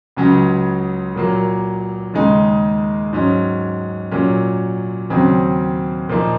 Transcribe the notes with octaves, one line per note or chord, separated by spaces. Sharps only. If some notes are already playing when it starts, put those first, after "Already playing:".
C#2 C#3 F#3 C#4
A#2 F#3 A#3
D#2 C#3 G#3 D#4
G#2 F#3 C#4
A#2 F#3 C#4
D#2 C#3 F#3 C4
A#2 F3 A#3 D#4